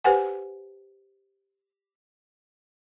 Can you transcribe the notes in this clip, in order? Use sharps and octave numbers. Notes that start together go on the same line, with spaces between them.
G4 B4 C5 F#5 G#5